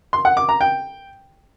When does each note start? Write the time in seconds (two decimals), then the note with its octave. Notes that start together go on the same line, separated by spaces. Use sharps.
0.13 C6
0.25 F#5
0.37 D6
0.49 A#5
0.61 G5